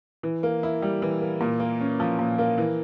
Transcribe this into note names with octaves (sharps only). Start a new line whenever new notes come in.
E3
A#3
E4
G3
E3
A#3
A#2
A#3
C#4
F3
A#2
A#3
E3